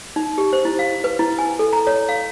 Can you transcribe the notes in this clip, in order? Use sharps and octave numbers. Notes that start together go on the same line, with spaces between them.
D#4
G4
C5
E4
F5
B4
E4
G#5
A4
A#5
C#5
F5